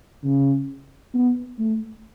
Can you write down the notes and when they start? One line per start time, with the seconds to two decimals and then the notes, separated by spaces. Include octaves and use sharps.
0.24 C#3
1.14 B3
1.59 A3